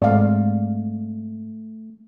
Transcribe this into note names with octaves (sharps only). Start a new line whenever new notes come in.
G#2 G#3 A3 C4 D5 F5